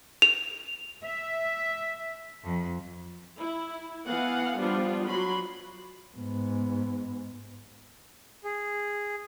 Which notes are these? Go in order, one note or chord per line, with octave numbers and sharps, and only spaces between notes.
F7
E5
F2
E4
E3 B3 F5 F#5
F3 G3 B3 D4 F4
F#3 B5 C6
G#2 B3
G#4